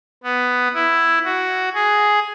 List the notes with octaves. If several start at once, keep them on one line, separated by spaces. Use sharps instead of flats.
B3
E4
F#4
G#4